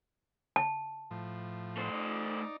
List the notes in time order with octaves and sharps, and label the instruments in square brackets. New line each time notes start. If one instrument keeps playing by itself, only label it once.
[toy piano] A5
[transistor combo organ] A2 F3
[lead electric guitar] A3 C5
[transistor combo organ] D#4 D5